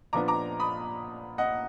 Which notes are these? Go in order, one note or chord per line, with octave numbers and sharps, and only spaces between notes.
A#2 F3 B3 D4 A#5 D6
A#5 D6
B5 D#6
D#5 F#5